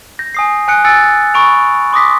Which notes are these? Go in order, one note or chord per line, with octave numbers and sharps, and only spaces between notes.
G6 A#6
G#5 D#6 C7
G#5 F#6 C#7
G#5 E6 A6 C#7
B5 C#6 D7 F7
C6 D6 D#6 A#6 B6